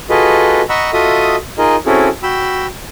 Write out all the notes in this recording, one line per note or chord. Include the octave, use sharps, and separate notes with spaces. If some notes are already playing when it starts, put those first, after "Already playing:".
F4 F#4 G#4 A4 B4 D#5
D#5 F#5 A#5 B5 C#6 E6
F4 F#4 A4 D#5 E5 D#6
D#4 F4 G#4 A#4 D#5
C4 C#4 E4 F#4 G#4 A4
F#4 G5 B5 E6